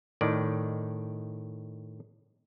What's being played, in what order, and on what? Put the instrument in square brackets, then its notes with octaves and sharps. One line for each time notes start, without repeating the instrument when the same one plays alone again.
[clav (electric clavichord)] A2 D#3 D5